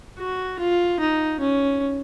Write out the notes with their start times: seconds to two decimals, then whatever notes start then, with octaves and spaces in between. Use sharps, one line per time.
0.19 F#4
0.59 F4
1.00 D#4
1.40 C#4